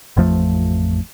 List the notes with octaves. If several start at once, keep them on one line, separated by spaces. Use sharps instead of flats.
A1 F2 F3 A3